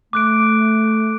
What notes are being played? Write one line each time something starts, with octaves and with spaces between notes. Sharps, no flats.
A3 D6 F#6 D7